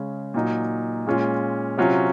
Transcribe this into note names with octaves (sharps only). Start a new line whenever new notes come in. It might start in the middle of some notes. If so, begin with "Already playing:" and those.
Already playing: C#3 G#3 C#4
A#2 F#3 A#3 D#4
A#2 G#3 C#4 F4
C3 F#3 C#4 F4